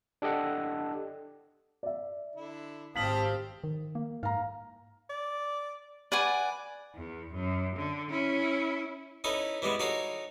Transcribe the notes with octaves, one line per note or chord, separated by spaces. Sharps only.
D4 G4 A4 D#5 F#5
D5 E5
D3 E4
G#1 C4 G4 F5 A5 D#6 B6 F#7
D#3
A#3
G#2 F5 A#5
D5
B4 D5 F#5 G#5
E2
F#2
D3
C#4 E4
C#4 D#4 E4 A4 B4
E3 G3 G#3 B3
D#4 F#4 A4 A#4 C#5 F5